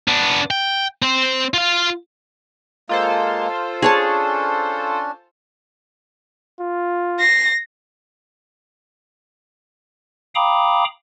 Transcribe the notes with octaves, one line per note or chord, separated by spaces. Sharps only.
B3 D4
G5
C4 C5
F4 F5
G#3 A#3 F4 A4 C5
C#4 D4 G#4 C#5 A5
F4
A#6 C7
F5 G5 A#5 B5 D6 D#6